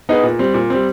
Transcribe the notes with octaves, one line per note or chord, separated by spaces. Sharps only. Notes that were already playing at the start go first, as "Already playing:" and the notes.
B3 D#4 G#4 B4
A#2
G3 C4
A#2
G3 C4